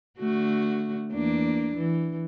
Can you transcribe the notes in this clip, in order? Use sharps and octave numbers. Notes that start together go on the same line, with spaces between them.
D3 A3 F#4
E2 A#3 D4
E3